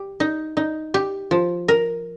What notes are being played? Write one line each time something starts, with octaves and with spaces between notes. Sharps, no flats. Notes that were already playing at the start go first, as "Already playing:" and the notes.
Already playing: G4
D#4
D#4
G4
F3
A#4